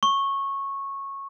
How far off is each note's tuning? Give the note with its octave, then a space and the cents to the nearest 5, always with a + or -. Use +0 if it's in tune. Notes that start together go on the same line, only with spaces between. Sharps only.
C#6 -15